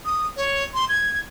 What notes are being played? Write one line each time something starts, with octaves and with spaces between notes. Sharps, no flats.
D#6
C#5
C6
G#6